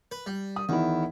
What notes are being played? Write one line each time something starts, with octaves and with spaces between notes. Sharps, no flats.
B4
G3
D#6
E2 D#3 E4